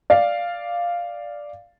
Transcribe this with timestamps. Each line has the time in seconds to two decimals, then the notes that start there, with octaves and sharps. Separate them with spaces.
0.10 D5 F5